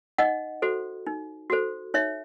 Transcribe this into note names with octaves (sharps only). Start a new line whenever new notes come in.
D#4 D#5 F#5
F#4 A4 C5
D#4
F#4 A4 C5
D#4 C#5 E5